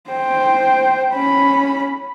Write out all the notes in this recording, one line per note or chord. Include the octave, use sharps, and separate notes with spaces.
C5 G5
C#4 B5